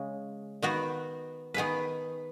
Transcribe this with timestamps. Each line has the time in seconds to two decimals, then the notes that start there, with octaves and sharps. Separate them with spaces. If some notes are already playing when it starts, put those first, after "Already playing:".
Already playing: C#3 G#3
0.62 D#3 B3 F#4
1.54 D#3 B3 G#4 B4